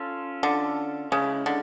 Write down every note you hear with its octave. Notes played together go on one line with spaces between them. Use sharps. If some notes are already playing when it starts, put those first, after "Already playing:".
Already playing: C#4 F4 A4
D3
C#3 G#3 C#4 E4
D3